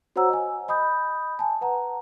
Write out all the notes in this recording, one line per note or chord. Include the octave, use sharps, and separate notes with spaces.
F#4 C5 C#5 F#5 A#5 E6
D#5 G#5
D#5 B5 D#6 G6
G#5 A5
B4 F#5 A#5